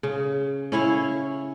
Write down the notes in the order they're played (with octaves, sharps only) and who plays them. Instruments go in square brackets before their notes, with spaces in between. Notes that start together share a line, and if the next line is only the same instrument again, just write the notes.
[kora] C#3
C#4 E4 C#5 F5